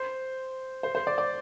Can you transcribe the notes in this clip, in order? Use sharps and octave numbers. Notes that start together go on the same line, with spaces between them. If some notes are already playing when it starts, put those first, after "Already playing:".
Already playing: C5
C5
C5
D5
D5